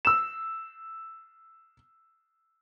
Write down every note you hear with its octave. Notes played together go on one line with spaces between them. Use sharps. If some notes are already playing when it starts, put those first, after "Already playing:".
E6 E7